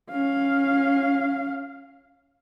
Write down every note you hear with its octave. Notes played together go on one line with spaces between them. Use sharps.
C#4 F5